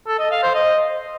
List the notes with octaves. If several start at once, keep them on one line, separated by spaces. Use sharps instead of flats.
A4
D#5
F5
C5
D#5